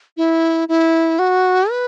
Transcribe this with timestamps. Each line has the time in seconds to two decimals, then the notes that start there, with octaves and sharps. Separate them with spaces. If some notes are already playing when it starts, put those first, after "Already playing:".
0.17 E4
0.68 E4
1.19 F#4
1.70 B4